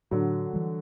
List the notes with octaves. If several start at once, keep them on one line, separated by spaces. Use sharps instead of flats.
A2 D3 F#3
E3 G3